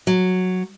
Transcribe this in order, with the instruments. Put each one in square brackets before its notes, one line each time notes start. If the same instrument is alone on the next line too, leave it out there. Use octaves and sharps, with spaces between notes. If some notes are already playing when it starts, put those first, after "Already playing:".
[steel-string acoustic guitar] F#3